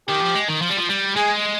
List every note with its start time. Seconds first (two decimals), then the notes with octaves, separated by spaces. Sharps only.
0.08 D#3 G4
0.21 F3
0.35 G#3
0.48 D#3
0.62 F3
0.70 G3
0.77 F3
0.90 G3
1.16 G#3 G#4